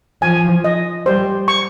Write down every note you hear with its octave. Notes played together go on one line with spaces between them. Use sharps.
F3 G#5
D#5
G3 C5
C#6